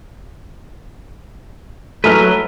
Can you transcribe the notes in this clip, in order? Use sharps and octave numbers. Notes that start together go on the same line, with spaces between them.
F#3 A3 B4 A#5 F6